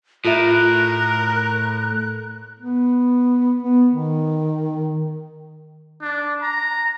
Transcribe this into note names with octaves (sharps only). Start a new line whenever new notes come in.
A2 F4 A#4 E5 F#6
B3
B3
D#3
D4
A#5